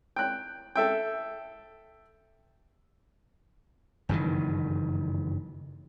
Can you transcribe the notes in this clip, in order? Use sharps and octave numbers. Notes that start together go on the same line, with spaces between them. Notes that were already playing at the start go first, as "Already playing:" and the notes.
G5 F#6
A4 E5 G5
F#1 G2 D#3 E3